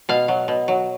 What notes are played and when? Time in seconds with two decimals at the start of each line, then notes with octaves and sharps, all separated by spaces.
0.09 B2 F5
0.28 F#3
0.48 B2
0.68 F#3